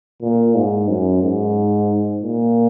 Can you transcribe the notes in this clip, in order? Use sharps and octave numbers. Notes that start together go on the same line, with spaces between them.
A#2
G#2
F#2
G#2
A#2